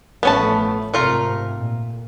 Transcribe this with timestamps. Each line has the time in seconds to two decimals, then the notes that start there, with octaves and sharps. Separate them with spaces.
0.23 A1 F3 A3 B3 C#4 A5
0.94 G#2 C3 A3 F4 A#4
1.58 A#2